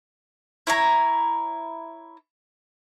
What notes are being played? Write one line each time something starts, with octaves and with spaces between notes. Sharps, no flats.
E4 C#5 A#5